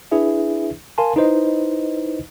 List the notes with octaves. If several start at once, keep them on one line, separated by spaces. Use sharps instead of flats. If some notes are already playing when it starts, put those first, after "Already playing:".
D4 E4 G#4 B4 E5
A#4 F5 G#5 A5 C6
D#4 E4 B4 C5 D#5